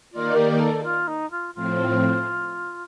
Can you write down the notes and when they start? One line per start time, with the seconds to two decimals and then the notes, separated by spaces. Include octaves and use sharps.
0.11 D#3 A#3 D#4 F4 A#4 D5
0.35 G4
0.60 A4
0.83 F4
1.07 D#4
1.31 F4
1.54 A2 F3 C4 F4